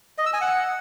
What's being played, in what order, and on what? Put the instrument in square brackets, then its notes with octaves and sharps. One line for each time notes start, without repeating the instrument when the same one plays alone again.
[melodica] D#5
E6
G#5
F#5